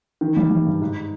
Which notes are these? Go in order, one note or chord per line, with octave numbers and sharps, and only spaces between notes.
D#3
G3
G3
G2
G#2